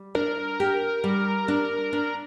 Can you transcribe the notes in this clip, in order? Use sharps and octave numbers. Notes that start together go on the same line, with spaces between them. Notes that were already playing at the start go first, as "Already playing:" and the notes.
Already playing: G3
D4 A#4
G4
G3
D4
D4